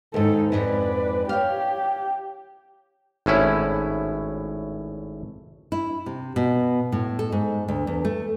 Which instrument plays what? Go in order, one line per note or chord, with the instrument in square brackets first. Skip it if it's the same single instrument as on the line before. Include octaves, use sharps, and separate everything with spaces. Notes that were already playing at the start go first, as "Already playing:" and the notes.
[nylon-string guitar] D#2 G#2 [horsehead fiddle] D#4 A4
[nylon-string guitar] F2 G#2 [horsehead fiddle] B4 D5
[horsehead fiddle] G4 [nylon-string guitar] C#5 F5
[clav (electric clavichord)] G#1 A2 C#4 E4
[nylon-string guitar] E4
C3
B2
A2
A4
G#2
D2
E2
A3